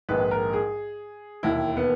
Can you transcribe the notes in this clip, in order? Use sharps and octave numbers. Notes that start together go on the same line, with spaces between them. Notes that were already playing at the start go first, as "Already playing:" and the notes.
A#1 G#2 D#3 G#3 B4
A#4
G#4
E1 D#2 D#3 E4
B3